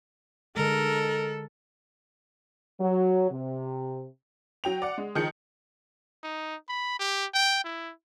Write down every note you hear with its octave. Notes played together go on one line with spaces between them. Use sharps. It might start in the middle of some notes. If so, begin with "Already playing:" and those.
D3 G#3 A4 A#4
F#3
C3
F#3 G5 F7
D5 F#5
G#3
D#3 F3 G#4 G6 C#7
D#4
B5
G4
G5
E4